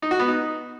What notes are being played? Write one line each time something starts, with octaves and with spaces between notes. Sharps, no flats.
D#4
F#4
B3
D#4